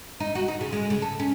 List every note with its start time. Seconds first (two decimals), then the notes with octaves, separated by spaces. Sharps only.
0.20 D#4
0.35 F#4
0.48 D#4
0.61 C#3
0.72 G#3
0.90 C#3
1.02 A4
1.20 C#4